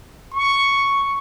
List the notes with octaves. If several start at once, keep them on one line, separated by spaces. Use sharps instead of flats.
C#6